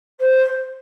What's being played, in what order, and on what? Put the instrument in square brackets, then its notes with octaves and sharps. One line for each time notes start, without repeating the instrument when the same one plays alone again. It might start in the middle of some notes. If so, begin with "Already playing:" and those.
[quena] C5